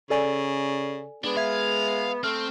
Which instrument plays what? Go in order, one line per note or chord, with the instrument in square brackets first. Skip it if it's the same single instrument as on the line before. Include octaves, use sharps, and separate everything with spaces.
[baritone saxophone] C#3 [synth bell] A4 D5 G#5
[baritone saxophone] G#3 [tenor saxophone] B3 [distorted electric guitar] D4
[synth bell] E5 G#6 [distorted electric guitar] F5
[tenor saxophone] A3 [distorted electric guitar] C4 [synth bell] F6